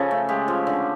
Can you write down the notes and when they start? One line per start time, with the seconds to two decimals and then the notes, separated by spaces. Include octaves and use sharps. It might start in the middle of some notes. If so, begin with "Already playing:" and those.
Already playing: C#3 F3 A4
0.11 A3
0.29 G#3 G4
0.48 F3
0.67 D3